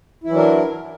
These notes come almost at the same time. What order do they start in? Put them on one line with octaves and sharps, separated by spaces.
E4 E3 F#3 D4 A#4